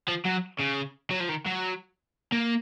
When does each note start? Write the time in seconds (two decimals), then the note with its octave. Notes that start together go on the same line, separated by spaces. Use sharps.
0.08 F3
0.26 F#3
0.60 C#3
1.11 F#3
1.20 F3
1.29 D#3
1.46 F#3
2.32 A#3